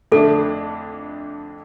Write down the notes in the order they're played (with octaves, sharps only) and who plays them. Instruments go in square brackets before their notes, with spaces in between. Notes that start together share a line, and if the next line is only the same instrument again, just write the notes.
[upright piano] F2 D3 A3 D4 [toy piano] A4